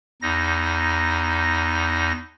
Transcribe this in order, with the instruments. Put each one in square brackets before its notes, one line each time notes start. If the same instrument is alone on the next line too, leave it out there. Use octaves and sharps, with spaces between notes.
[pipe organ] E2 D#4 A#6